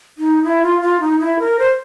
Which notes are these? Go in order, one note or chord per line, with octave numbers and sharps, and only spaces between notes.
D#4
E4
F4
F4
D#4
E4
A#4
C5